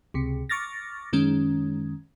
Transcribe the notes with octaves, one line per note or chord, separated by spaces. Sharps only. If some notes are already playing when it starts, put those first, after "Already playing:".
C#2 C3
C#6 D6 F6 A6 A#6
F#2 D#3 G#3 C#4